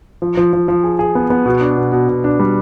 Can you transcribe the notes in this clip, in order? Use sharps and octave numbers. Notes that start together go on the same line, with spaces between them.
F3
F3
F3
F3
G#4
G#4
B3
B3
B2
D4
B2
B2
B2
D4
G3